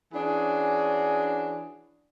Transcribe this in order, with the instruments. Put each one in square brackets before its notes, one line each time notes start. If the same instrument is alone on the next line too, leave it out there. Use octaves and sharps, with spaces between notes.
[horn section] E3 C#4 D4 F#4 G#4